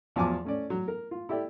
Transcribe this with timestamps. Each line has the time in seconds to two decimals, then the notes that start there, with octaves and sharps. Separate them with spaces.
0.16 E2 F3 F#3 G#5 A5 D6
0.45 A3 C#4 D5
0.70 F#3
0.88 A#4
1.11 F4
1.29 E4 G4 A4 D5